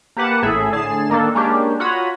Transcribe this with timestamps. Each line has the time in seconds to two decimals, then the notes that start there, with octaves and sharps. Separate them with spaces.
0.17 A#3 G4 B4 F#5 A5
0.43 A1 A2 G#4 A4 E5 B5
0.72 A2 D3 G#4 A5 C7 E7
1.10 D#3 A#3 D4 A4
1.35 G#3 A#3 C#4 D4 G4
1.80 F4 F#4 C#5 A#5 B5 D#6